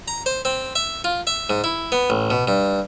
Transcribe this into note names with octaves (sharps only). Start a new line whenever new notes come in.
A#5
C5
C4
E5
F4
E5
G#2
E4
B3
A1
B2
G2